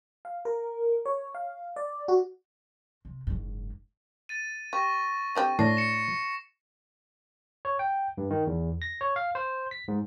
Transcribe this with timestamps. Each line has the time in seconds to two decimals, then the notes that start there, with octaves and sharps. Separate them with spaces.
0.25 F5
0.45 A#4
1.06 C#5
1.35 F5
1.76 D5
2.08 F#4
3.05 C3
3.27 F#1 G#2
4.29 A6 D#7
4.73 G4 C#6 A#6
5.35 D3 C4 G4
5.59 A2 D4 A#6 C7
5.77 C#7 E7
7.65 C#5
7.79 G5
8.18 G2
8.30 D#3
8.47 E2
8.82 A#6
9.01 C#5
9.16 F5
9.35 C5
9.71 B6
9.88 G#2